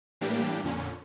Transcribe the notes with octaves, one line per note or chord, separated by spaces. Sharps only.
A2 E3 G3 A#3 D4 G4
F2 A#2 D3 C#4